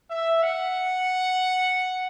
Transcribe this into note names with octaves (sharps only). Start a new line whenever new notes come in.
E5
F#5